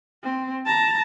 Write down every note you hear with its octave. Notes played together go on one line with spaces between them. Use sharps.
C4
A5 A#5